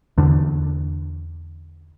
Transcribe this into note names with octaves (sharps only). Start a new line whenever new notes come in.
E2 D3